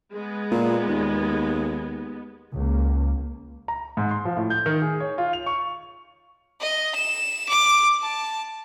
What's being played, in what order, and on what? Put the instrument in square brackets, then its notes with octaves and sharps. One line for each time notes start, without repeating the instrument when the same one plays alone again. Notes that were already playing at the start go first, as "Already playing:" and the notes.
[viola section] G#3 B3
[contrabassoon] A#2
D#2
[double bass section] C#2 A#3
[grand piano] A#5
G#2
C6
F3
A2
G6
D#3
G#4
C#5
F4
F7
C#6
[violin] D#5
E7
D6
A5